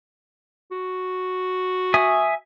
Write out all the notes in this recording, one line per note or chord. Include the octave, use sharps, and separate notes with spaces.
F#4
E5 G#5 D#6